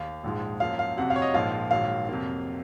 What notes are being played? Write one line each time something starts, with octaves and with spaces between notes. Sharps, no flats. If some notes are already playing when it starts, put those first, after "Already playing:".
Already playing: D#2 F5
A#1 G#2 F3 G#3
F#2 F3 A#3 F5
F5
F2 C3 F#3 F#5
F5
C#5
D#5
A#1 G#2 F3 A#3 F5
A#1 G#2 D#3 F#3 A#3 F5
F2 C3 F#3 A#3